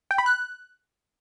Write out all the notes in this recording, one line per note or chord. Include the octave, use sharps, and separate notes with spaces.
G5
B5
F#6